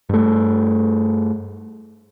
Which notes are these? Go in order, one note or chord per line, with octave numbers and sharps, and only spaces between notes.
G2 A3